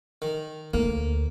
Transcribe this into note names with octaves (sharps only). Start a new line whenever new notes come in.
D#3
D2 A#3